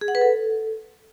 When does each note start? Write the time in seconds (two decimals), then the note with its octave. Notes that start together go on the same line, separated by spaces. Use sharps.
0.01 G#4
0.08 F#5
0.15 B4
0.21 A4